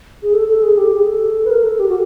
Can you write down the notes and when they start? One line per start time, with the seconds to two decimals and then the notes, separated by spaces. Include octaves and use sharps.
0.23 G#4
0.33 A4
0.49 A4
0.62 G#4
0.77 G4
0.92 G#4
1.06 A4
1.45 B4
1.50 A#4
1.64 A4
1.79 G4
1.89 F#4